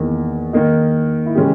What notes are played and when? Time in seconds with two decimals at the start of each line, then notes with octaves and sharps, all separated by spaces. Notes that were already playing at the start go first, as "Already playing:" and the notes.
Already playing: E2 D#3 A#3
0.53 D#3 A#3 D#4
1.26 E4
1.35 C#3 E3 G#3 C#4 G4